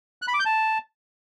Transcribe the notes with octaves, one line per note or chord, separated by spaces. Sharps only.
F#6
B5
D6
G6
A5